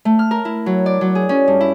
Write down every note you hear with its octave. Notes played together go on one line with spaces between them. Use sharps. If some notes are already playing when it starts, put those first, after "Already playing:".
A3
F6
A#4
E4
F#3
D5
F#3
G#4
C#4
G2
E4